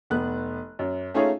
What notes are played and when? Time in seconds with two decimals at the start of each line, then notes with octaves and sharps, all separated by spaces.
0.10 F1 B3 F#6
0.79 F#2
1.14 A3 C#4 D#4 F4 G#4 C#5